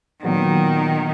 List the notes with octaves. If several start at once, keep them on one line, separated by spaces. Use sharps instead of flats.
A#2 D#3 F#3 B3